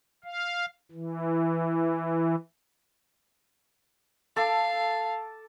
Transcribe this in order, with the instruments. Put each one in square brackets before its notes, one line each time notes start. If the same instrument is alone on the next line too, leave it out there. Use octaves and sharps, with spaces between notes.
[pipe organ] F5
E3
[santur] A4 A5 D6 [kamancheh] F5